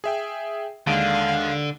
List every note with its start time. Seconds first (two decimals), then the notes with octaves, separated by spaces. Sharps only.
0.04 G#4 E5 G5
0.87 D#2 D3 G#3 F5 D7